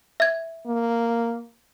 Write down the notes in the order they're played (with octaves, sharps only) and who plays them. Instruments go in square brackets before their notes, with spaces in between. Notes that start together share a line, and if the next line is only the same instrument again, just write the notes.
[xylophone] E5 G#6
[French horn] A#3